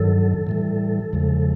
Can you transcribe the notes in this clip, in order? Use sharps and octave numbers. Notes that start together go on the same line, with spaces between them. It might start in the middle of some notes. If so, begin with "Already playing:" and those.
Already playing: G2 D#3 F#3 A4
A2 E3 G3
E2 C#3 F3 G#3